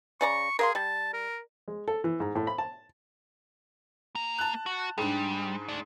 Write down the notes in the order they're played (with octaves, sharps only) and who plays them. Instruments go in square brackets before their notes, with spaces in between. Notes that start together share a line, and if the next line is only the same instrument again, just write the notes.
[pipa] C#3 D5 A#5 [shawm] C#6
[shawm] G#4 [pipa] A#4 F5 C6
[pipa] G3 [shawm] A5
[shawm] A#4
[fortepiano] G#3
A4
E3
G#2
A2
B5
A5
[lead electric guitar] A#3 A#5
[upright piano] A5 F#6
[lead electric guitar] F#4
[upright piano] G#2 D4 [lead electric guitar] G3
[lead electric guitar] A3 D5